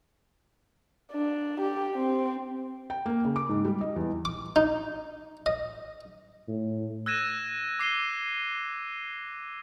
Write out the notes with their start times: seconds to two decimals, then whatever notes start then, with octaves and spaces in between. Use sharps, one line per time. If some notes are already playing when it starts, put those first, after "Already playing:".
1.12 D4
1.60 G4
1.95 C4
2.90 G5
3.06 A#3
3.25 C#3
3.36 D6
3.49 G#2
3.65 G3
3.81 D#5
3.96 E2
4.25 D6
4.56 D#4
5.46 D#5
6.48 A2
7.06 E6 F#6 G#6 A#6 D#7 E7
7.79 D6 C7 D#7 G7